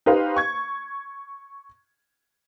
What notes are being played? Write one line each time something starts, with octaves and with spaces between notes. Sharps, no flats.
D#4 G4 B4 C5 F5
C#6 G#6